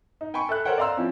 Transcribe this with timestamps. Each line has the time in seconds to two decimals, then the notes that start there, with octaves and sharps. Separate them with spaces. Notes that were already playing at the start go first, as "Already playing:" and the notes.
0.21 D#4
0.34 G5 G#5 B5 C#6
0.49 A4 E5 F#6
0.65 A4 A#4 C5 C#5 F#5 G5
0.78 D5 D#5 F5 A#5 C6 E6
0.97 F3 C4 C#4 E4